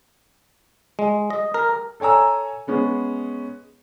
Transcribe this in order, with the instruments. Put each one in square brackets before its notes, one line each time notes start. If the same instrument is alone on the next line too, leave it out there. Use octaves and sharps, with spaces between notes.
[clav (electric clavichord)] G#3
D#5
A#4
[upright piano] A4 C#5 G#5 A#5 E6
G#3 B3 C#4 G#4